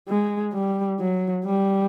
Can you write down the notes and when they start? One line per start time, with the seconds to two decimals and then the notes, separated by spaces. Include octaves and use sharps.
0.08 G#3
0.53 G3
0.99 F#3
1.45 G3